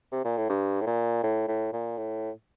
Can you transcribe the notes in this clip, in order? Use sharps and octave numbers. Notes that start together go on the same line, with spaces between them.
C3
A#2
A2
G2
A2
A#2
A2
A2
A#2
A2